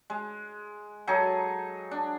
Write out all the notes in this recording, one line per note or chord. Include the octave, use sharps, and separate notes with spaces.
G#3
F#3 D#4 G#4 A4
D4